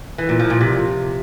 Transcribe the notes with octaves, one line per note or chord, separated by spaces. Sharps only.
E3
A#2
F3
A#2
C3